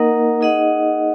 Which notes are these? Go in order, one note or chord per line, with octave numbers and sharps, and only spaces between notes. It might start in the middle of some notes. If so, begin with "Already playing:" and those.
Already playing: A#3 D#4 A#4 D#5 F#5
D#4 G#4 D#5 F#5